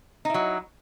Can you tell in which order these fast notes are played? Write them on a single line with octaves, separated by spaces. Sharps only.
D#4 E4 F#3